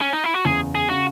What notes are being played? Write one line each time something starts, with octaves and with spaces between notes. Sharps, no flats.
C#4
D#4
E4
F#4
F#1 E2 C#3 G#4
G#4
C#3 F#4